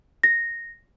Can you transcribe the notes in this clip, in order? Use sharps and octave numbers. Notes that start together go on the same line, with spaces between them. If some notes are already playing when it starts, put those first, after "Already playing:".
A#6